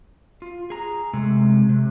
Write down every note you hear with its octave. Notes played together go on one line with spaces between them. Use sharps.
F4
G#4 A#5
C3 G#3 A3
C3